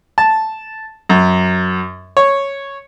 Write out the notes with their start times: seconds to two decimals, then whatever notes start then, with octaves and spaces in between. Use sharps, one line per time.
0.18 A5
1.09 F#2
2.17 C#5